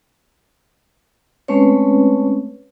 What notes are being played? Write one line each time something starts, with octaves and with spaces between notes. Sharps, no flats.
G#3 A3 C4 C#4 B4 C#5